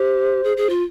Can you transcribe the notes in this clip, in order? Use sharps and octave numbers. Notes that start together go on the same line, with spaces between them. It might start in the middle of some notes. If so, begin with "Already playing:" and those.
Already playing: G4 C5
G#4
G#4
F4